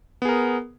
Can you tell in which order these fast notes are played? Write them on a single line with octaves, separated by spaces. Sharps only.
B3 G#4 A#4